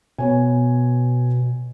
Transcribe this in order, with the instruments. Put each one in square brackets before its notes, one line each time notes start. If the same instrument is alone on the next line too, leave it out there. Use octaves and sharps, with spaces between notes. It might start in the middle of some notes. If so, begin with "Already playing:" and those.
[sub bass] B2 [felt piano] B3 C#5 G#5